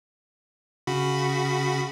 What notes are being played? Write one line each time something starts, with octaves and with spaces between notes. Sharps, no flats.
C#3 F#4 B5